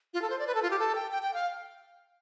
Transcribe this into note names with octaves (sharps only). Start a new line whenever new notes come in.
F4
A4
C5
D5
B4
A4
F4
G4
A4
G5
G5
G5
F5